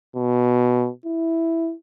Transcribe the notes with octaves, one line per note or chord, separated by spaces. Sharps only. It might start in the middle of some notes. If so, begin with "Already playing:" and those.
B2
E4